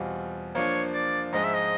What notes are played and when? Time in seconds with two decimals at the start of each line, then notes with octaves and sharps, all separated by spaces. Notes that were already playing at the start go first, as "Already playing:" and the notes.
Already playing: E2 B2 G3 C4 F4
0.55 F3 A#3 D4 F4 C#5
0.94 D5
1.33 G#2 F3 G#3 D#5
1.44 E5
1.54 D#5